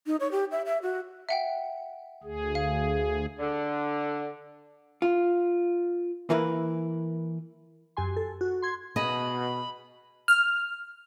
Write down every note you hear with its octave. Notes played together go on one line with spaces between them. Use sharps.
D#4
C#5
G4
E5
E5
F#4
E5 F#5 G5
D2 G#4
F5
D3
F4
E3 A#3 E4 A#4 B4
F#2 G4 G#5 C6
A4
F#4
C6 G#6
B2 G#4 D#5 B5
F6